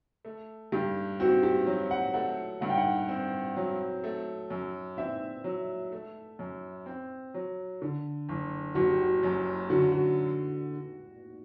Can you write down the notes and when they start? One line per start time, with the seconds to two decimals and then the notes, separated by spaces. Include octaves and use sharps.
0.25 A3
0.72 G2 G4
1.20 C4 F#4
1.43 G4
1.67 F#3
1.91 F#5
2.14 A3 F#5
2.61 G2 F#5
2.69 G5
2.77 F#5
3.09 C4
3.56 F#3
4.04 A3
4.50 F#2
4.97 C4 E5
5.44 F#3
5.92 A3
6.39 F#2
6.86 C4
7.34 F#3
7.82 D3
8.29 F#1
8.75 F#1 F#4
8.89 G4
9.03 F#4
9.23 F#2
9.70 D3 F#4
9.92 F#4